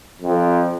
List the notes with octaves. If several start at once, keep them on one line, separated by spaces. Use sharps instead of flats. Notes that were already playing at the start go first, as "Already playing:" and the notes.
F2